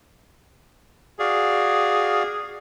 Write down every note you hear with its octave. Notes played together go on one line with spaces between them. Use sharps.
F#4 G#4 D5 F5